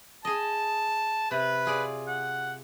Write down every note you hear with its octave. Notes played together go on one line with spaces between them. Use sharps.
G#4 D#5 A5
C3 B4
F4 G#4 D5
F#5